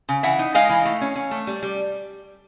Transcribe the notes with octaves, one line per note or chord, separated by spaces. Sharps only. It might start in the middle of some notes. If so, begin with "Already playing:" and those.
C#3
E3 E5 F#5
D#4
G#3 D#5 F5
E3
A3
C#4
C#4
A3
G3
G3